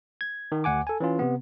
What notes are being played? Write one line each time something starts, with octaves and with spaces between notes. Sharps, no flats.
G#6
D#3
D2 F#5 G#5 D6
A4 G#5
E3 C#4 F4
C3 B3